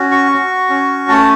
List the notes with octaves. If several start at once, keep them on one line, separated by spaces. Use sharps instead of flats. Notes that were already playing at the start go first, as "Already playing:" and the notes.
Already playing: C#4 F#4
C#6
F#4
C#4
A3 A5